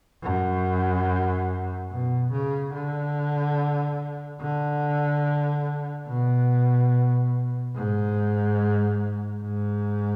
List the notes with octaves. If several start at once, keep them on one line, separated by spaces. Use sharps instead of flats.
F#2
B2
C#3
D3
D3
B2
G#2
G#2